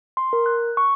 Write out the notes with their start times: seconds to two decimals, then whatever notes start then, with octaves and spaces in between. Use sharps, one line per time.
0.17 C6
0.33 A#4
0.46 F#6
0.77 C#6